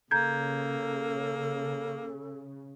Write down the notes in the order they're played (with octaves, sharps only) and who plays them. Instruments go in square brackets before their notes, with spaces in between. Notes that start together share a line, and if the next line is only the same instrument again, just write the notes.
[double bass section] C#3 [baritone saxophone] A#3 [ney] A4 [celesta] A#5 G6 G#6